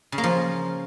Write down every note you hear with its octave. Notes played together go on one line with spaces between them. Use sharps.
C#3
A#3
F3